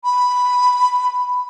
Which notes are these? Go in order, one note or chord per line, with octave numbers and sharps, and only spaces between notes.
B5